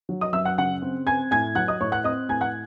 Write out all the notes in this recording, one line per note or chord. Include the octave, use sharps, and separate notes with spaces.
F#3
D#5 D#6
F#2 E5 E6
F#5 F#6
C#3 F#5 F#6
C4
C4 G#5 G#6
A2 G#5 G#6
F#3 F#5 F#6
D#5 D#6
A2 C#5 C#6
F#5 F#6
C4 D#5 D#6
A2 G#5 G#6
F#5 F#6